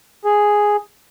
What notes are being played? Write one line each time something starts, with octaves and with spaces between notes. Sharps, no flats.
G#4